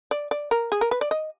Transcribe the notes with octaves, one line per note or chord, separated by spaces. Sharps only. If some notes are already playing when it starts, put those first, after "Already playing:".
D5
D5
A#4
G#4
A#4
B4
D5
D#5